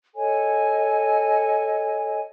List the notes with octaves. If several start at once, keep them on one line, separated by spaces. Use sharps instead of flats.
A4 C#5 D#5 G#5